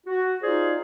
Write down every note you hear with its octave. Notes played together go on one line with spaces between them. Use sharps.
F#4
D#4 F4 G#4 C5 D5